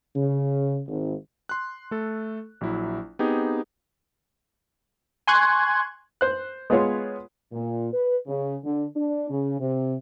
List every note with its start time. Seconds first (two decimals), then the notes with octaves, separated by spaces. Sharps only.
0.16 C#3
0.88 G#1
1.49 C6 F#6
1.91 A3 A4
2.61 A#1 F#3 E4
3.19 B3 C4 D#4 G4 G#4
5.27 G#5 C6 C#6 F#6 G#6
6.21 C5 F#6
6.70 G#3 B3 F4 G#4 C#5
7.52 A#2
7.92 B4
8.27 C#3
8.64 D3
8.96 D4
9.30 C#3
9.59 C3